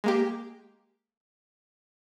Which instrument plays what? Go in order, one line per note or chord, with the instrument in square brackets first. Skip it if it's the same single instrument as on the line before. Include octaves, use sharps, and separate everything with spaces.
[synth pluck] G#3 A#3 G4